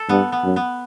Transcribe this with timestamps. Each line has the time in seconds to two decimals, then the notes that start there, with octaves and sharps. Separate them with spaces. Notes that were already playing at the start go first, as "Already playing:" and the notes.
Already playing: A4
0.09 G2 B3
0.32 B3
0.44 F#2
0.56 B3